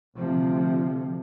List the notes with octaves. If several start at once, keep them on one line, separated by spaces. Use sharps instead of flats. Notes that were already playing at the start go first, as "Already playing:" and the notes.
D2 C3 F3